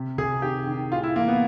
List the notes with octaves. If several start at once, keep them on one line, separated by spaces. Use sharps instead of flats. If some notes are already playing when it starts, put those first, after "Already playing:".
Already playing: C3
C3 G#4
D#3 G4
D#3
A2 F4
E4
E3 A#3
B3